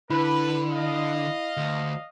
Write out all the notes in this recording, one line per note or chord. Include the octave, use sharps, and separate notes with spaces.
D3 E4 B4 B5
D#5 F5
D2